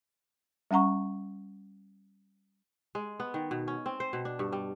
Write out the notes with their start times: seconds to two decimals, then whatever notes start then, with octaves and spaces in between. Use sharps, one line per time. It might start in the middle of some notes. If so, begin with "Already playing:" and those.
0.71 G3 C#4 F#5 A#5 C#6
2.95 G#3
3.20 B3
3.34 D#3
3.51 B2
3.68 C#4
3.86 C4
4.00 C5
4.13 B2
4.25 D4
4.39 G2
4.52 G3